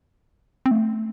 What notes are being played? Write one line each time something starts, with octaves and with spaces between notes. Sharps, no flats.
C4
A3